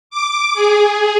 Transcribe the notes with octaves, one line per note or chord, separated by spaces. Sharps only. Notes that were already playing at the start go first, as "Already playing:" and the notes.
D6
G#4